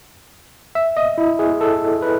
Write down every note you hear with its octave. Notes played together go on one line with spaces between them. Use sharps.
E5
D#5
E4
G#4
A4
B4